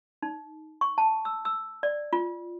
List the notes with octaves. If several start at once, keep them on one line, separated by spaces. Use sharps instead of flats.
D#4
C#6
A5
E6
E6
D5
F4